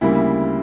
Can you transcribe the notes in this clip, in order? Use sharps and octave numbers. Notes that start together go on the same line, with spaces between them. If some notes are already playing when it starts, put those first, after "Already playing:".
D2 C#3 G3 A#3 E4